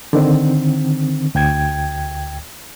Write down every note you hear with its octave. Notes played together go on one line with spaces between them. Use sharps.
D3 D#3 C4
D2 G5 G#6